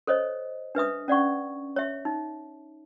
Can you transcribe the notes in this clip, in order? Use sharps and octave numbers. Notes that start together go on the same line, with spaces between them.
A4 C5 C#5 D#5
D4 B4 E5 D#6
C#4 D5 F#5 C#6
C#5 E5
D#4